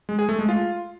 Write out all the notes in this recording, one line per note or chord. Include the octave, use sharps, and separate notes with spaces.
G#3
G#4
A3
G#3
F4